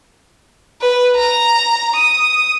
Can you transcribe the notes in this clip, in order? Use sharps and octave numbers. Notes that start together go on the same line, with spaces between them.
B4
A#5
D#6